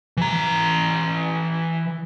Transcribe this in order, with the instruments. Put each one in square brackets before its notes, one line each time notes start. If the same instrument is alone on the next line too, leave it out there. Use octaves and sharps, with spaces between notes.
[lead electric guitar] E3 A#5